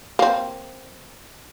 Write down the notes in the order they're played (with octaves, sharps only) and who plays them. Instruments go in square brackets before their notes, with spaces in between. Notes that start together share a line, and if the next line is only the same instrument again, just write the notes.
[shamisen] A#3 C4